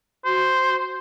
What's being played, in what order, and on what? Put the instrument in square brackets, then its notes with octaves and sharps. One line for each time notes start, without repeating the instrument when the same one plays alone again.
[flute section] F#4 [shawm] C5